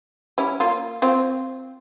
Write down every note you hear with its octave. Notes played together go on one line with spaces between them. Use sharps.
G3 C#4 E4
A#3 F4
C4 F4